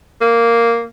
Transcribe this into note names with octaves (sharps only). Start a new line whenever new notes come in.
A#3